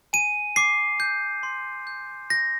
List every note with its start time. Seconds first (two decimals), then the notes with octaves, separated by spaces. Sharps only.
0.13 G#5 D#7
0.56 D6 C7
1.00 G6
1.43 C6
1.87 G6
2.30 G6 A#6